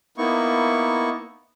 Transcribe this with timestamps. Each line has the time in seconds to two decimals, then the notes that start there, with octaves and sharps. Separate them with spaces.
0.18 A#3 B3 D#4 E4 C#6